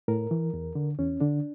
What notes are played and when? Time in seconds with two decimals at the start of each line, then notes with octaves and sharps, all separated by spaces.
0.08 A2 A#4
0.31 E3
0.54 E2
0.75 D3
0.98 E2 C#4
1.21 D3 D4